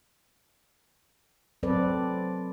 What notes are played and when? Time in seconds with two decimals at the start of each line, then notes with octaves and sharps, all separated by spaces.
1.63 F#3 C4 A4 B4 D5